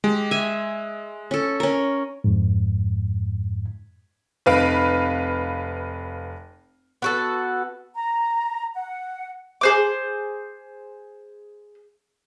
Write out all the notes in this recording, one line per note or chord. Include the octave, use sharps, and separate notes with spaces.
G#3 G4
E5 G#5
C#4 A4
C#4 A#4
F2 G#2
F1 B4 F5 B5 D7
B3 F#4 A4
A#5
F#5
G#4 C5 D6